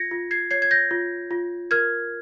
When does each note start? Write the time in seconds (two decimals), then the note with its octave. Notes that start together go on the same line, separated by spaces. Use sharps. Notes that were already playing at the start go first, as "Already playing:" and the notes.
Already playing: F4 G#6 A#6 C#7
0.11 F4
0.31 G#6 C7
0.51 C#5 G#6 C7
0.62 G#6
0.71 G6 A#6
0.91 F4
1.31 F4
1.71 A#4 F6 G#6